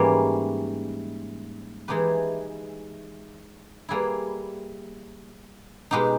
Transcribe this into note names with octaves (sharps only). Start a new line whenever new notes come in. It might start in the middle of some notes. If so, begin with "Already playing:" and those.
Already playing: G#2 E3 G3 A#3 C#4
E3 G#3 D#4 G4 B4
G3 A#3 E4 G#4 B4
B2 G#3 D#4 G4 B4